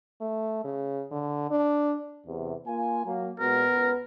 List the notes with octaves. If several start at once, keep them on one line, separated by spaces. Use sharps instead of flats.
A3
C#3
D3
D4
E2 C3
A#3 F4 G#5
F#3 A#3
A#2 G#3 B3 F#4 A#4
C#2 B4